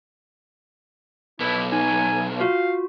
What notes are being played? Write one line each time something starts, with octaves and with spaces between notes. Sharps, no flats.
B1 B3 E4
D#4 G#5
F4 F#4 F5